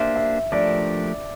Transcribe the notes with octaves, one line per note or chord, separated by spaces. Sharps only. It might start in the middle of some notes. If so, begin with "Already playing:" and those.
Already playing: A#3 D4 G4 C5 E5
E5
F3 A3 D4 G4 A#4 D5